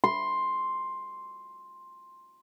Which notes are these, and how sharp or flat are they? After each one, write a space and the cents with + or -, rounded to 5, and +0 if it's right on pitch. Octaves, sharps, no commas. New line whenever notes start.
C6 +5